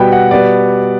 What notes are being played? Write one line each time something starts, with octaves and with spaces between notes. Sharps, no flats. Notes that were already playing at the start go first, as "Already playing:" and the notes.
Already playing: B2 G3 B3 G5 B5
F#5
B2 G3 B3 D5